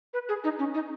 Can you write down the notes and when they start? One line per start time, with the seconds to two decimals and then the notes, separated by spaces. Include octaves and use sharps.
0.14 B4
0.29 G#4
0.44 D#4
0.59 C#4
0.75 D#4